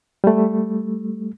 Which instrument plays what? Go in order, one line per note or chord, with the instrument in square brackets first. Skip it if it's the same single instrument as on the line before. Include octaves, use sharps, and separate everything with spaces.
[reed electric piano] G3 A3